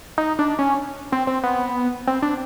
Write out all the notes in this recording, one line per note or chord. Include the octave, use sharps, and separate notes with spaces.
D#4
D4
C#4
C4
C4
B3
C4
D4